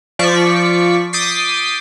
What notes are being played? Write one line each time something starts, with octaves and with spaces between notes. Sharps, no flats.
F3 D5 C#6 B6
D6 D#6 G6 A6 B6 C7